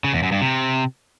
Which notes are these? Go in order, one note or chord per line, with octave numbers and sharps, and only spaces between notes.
C#3
E2
F#2
G2
C3